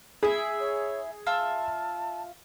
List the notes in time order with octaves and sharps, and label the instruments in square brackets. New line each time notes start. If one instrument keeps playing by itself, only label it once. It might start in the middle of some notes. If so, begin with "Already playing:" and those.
[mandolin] E4 E5 [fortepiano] G#4
[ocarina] C#5
[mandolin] F4 E5 E6 [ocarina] A5